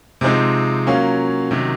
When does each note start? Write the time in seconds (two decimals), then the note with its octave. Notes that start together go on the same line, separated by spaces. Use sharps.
0.21 C3 F3 G#3 C4 D#4
0.87 F#3 A#3 C#4 F4
1.51 C3 D#3 F#3